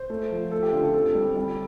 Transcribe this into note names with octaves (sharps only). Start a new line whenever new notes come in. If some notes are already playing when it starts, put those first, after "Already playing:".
Already playing: C5
A3
F3
A3 A4
G4
D3 F4
A4
C4 A4
G3
G3